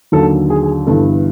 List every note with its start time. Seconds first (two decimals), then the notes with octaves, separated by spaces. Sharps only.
0.12 D#2 D3 F#3 A4
0.50 G#4
0.63 G#4
0.87 G1 G2 E3 A4